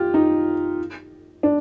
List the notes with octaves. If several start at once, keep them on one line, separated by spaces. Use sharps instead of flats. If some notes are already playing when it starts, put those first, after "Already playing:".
Already playing: F4 G4
D#4
D4